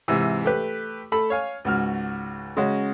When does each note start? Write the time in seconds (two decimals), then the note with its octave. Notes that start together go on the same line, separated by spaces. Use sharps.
0.08 G#2 C3 E3
0.44 A3 G4 B4
1.12 A3 A4 B5
1.30 C#5 F5 G#5
1.65 C#2 G#2 F#4 F6
2.57 C#3 G#3 C#4 F#4